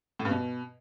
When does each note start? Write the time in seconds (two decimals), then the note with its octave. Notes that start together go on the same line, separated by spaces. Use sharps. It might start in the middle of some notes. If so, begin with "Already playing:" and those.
0.19 A2
0.25 G2
0.31 B2